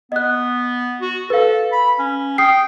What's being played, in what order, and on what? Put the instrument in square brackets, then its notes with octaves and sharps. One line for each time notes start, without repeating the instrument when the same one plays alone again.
[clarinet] B3 [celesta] D#5 F#6
[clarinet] F#4
[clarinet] A4 [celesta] B4 F5
[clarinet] B5
C#4
[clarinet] G5 [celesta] D#6 C7